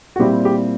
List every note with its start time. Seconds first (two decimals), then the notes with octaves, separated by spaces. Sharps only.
0.16 F#4
0.19 A#2 G3 C4 E4 G4
0.45 G4